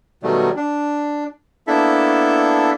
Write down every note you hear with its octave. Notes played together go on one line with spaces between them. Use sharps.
B2 D#3 F#3 G3 A3
D4
A#3 B3 D4 E4 A4 E5